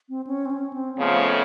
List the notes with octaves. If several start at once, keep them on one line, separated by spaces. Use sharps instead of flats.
C4
C#4
C4
C#4
C4
F2 C#3 F3 A3 B3